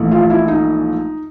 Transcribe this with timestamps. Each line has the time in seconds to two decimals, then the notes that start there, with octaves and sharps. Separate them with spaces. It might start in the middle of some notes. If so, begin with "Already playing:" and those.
Already playing: A#1 G#2 E3 A3
0.11 F4
0.30 E4
0.48 D#4